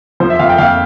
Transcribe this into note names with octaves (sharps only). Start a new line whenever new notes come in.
F3 C5
E5
F2 F5
G5
F2 F5